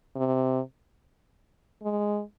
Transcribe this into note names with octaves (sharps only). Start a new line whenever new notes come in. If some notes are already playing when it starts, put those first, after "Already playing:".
C3
G#3